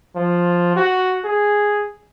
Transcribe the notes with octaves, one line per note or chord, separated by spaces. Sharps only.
F3
F#4
G#4